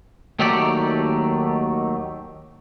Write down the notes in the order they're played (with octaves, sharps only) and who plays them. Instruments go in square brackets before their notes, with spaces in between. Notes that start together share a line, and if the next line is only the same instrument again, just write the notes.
[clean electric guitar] D#2 D#3 F#3 A3 G4 D5